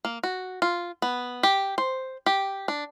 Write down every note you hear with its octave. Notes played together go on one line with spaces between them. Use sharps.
A#3
F#4
F4
B3
G4
C5
G4
D4